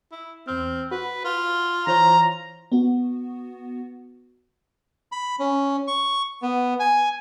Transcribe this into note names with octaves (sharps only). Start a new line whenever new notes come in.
E4
E2 C4 F6
F#4 B4
F4
E3 C5 C#5 A#5
B3 F#4
B5
C#4
C#6
B3
G#5